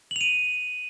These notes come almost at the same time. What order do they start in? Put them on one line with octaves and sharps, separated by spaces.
F#7 F7 D#7